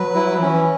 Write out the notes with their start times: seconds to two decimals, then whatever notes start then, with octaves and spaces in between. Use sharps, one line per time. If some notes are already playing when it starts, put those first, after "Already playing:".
Already playing: F#3 B4
0.15 E4
0.41 E3 C#4